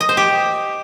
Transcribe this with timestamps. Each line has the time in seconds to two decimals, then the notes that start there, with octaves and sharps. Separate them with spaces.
0.01 D#5
0.09 C5
0.17 G4